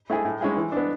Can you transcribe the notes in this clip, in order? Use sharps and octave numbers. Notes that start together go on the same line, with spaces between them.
A3 E4 G#4
A2
G#3 C#4 E4 G#4
E3
B3 D4